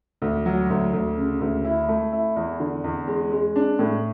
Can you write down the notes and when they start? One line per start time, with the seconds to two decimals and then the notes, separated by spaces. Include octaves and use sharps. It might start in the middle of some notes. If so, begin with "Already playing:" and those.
0.22 D2
0.46 F#3
0.70 D2
0.93 D2
1.17 C#3
1.41 D2
1.64 E4
1.89 A3
2.13 E4
2.36 E2
2.60 D3
2.84 E2
3.07 G#3
3.32 G#3
3.56 D4
3.79 A2